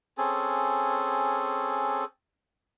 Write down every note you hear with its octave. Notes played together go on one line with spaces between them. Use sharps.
C4 C#4 G#4 A4